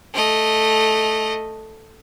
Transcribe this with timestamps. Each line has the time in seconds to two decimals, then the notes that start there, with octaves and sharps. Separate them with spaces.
0.13 A3 D#5